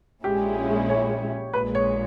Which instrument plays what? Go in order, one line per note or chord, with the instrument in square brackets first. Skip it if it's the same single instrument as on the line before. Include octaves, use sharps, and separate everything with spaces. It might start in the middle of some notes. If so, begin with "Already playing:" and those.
[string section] A#1 A#2 G#3 C#4 E4 [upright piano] G4
[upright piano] C#5
[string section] A#1 A#2 G#3 [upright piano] B4
[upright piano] C#5